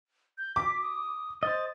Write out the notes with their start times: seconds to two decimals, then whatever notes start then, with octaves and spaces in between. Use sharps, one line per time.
0.38 G6
0.56 D6 B6
0.82 D#6
1.43 C5 D#5 A6